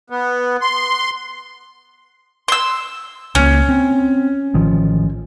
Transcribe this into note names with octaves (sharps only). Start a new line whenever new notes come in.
B3
C6
C6 E6
C#2 A#3 C#4
C4
A1 D#3 F3